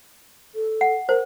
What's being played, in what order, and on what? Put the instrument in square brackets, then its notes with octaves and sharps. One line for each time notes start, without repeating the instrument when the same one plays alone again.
[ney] A4
[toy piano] F#5
[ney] A#4 [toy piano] C5